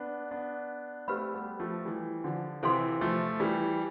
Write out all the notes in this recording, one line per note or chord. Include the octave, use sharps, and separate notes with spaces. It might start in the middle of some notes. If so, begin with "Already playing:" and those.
Already playing: B3 D4
B3 D4
A3 C4 G4 B4 F5 B5
G3 B3
F3 A3
E3 G3
D3 F3
C3 E3 A4 C5 F5 C6
F3 A3
E3 G3